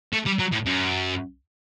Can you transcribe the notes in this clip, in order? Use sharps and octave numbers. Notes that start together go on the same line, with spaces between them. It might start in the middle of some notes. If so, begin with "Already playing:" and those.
A3
G3
F#3
A2
F#2